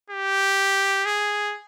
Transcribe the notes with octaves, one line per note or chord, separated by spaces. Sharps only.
G4
G#4